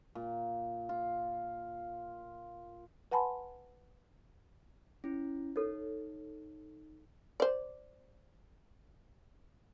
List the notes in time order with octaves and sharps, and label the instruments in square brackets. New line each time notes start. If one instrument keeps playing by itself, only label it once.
[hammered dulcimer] A#2
F4
[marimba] B4 F#5 G#5 A5 B5 C6
[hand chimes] C#4 E4
[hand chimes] D#4 [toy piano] A4 C#5
[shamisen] C5 D5